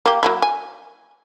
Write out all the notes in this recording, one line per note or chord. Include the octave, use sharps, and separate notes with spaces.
A#3 G4
F#3 A#3 E4
G#5